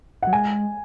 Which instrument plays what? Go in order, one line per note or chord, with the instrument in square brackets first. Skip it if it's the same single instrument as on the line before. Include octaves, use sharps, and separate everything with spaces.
[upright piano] F#5
[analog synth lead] F#3
[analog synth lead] G#3 [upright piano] G#5